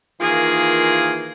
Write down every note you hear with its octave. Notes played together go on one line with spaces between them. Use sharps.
D#3 E3 A#3 F4 G#4